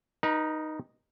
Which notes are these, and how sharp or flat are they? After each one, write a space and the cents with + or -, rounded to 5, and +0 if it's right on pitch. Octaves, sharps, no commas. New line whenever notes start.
D#4 -5 B4 -45